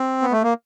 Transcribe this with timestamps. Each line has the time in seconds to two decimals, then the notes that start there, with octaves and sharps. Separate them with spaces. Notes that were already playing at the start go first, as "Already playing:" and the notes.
Already playing: C4
0.22 B3
0.32 A3
0.43 A#3